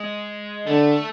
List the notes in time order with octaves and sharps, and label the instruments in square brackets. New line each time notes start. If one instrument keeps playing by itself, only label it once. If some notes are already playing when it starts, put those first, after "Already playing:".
Already playing: [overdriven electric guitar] G#3
[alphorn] D3 [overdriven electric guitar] A3